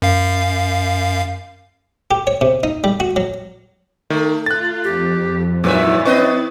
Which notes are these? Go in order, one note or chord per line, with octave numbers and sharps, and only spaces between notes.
F#2 F5
G4
C#5
C3
D#4
G3
F#4
F#3
D#3 A3
F4 F#6 A6
F2 G4
G2 A#2 F#3 E4 B4 E5 A6
C4 C#4 B4 D#5 C#6